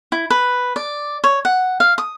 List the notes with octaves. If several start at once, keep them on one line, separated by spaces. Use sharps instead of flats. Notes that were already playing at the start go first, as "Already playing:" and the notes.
E4
B4
D5
C#5
F#5
F5
D#6